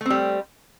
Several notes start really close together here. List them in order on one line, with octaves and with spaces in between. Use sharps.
A3 C4 G3